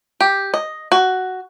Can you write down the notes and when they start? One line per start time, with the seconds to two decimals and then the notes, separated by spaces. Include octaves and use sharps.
0.20 G4
0.54 D#5
0.92 F#4